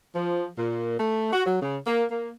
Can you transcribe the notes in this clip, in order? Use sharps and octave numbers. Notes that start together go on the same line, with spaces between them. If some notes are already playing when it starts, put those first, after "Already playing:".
F3
A#2
A3
F#4
F#3
C#3
A#3
A#3